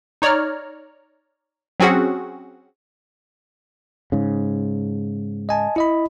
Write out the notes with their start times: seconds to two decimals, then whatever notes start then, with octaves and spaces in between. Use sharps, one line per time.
0.22 D#4 C#5 D5 A#5 F6
1.80 F#3 C4 C#4 F#4 G#4 F#5
4.12 G#2 C#3
5.49 D#5 G#5 A5
5.76 E4 D#5 B5